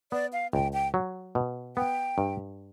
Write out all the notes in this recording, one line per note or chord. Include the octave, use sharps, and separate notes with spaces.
B3 D5
F5
C#2 G5
G5
F#3
B2
B3 G5
G2